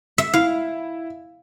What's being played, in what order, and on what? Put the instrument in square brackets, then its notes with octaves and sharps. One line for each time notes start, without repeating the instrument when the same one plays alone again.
[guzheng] E5
[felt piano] E4 [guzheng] F5